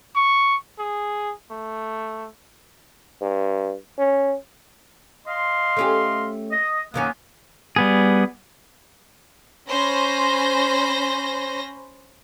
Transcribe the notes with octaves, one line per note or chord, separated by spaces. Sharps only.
C#6
G#4
A3
G2
C#4
D#5 F5 C6
A3 C#4 G4
D#5
F#2 D#3 A#3 B3 C#4
G3 B3 G#4
C#4 C5 B5 A#6